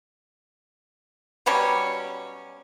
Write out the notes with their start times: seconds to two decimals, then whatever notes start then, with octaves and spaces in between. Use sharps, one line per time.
1.46 B2 F#3 G3 C#4